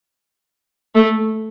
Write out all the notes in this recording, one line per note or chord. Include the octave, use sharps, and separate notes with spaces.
A3